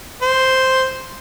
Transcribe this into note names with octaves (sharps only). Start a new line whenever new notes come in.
C5